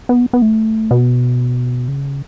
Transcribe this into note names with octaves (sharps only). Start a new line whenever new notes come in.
B3
B3
A3
B2
C#3